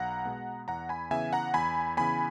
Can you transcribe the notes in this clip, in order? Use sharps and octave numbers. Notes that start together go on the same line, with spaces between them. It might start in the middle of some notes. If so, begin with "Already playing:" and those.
Already playing: B1 F#5 A#5
B2 G#3 B3
E2 F#5 A#5
G#5 B5
C#3 E3 B3 E5 G#5
F#5 A#5
E2 G#5 B5
C#3 E3 B3 G#5 B5